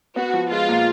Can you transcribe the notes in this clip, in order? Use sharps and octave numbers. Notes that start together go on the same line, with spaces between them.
B3 F#4
F3
G#3 F4
A#2